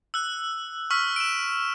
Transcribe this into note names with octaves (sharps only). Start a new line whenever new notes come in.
E6 F#6
C#6 E6 F6 B6
D7 E7